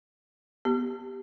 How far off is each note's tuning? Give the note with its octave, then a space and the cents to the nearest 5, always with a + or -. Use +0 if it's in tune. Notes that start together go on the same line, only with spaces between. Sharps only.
B3 +0 G4 +0